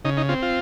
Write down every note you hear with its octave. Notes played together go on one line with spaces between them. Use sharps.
C#3 D#4
D#4
C4 F4
F4